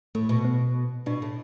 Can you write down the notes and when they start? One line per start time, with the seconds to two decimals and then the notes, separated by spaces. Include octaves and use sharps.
0.15 A2 A3
0.29 B2
0.45 B3
1.06 B2 D4
1.22 A2